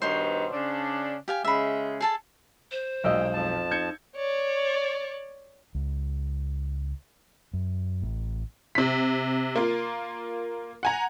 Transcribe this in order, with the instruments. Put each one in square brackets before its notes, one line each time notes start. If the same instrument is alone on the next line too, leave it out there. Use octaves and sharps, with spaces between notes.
[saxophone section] G2 B2 D#3 [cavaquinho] C5 C#5 C6
[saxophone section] C#3 D4
[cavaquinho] G4 F5 G#5
[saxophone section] C#3 G#3 [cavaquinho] E5 B5
[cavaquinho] G#4 A4 A5
[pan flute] C5
[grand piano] B1 F5 E6 [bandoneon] A#2 G5 [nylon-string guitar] G#3 D#5
[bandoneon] F2 F3 A5
[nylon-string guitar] D#4 [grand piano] G6 G#6 C#7
[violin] C#5 D5
[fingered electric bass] C#2
F#2
A1
[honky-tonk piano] C3 B6
A#3 F4
F#5 G#5 A#5